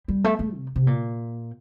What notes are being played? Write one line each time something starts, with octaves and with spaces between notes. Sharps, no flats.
G3
A3
A3
C3
C3
A#2